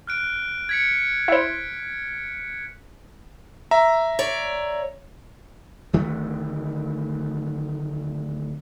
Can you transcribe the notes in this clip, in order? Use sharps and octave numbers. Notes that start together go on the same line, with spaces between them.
F6 F#6 D7
G#6 B6 C#7
E4 C5
E5 A#5
C#5 D5
D1 D2 D#3 A3